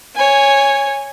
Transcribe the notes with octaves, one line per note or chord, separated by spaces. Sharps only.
C#5 G#5